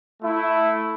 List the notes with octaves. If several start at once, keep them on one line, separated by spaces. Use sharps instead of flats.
A3 E4